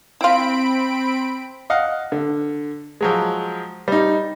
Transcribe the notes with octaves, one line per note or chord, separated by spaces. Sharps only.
C4 E4 F4 B5 D7
D#5 F5 F#5
D3
F3 F#3 G#3
G3 D#4